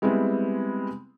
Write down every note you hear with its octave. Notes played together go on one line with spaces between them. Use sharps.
G3 G#3 B3 C4 E4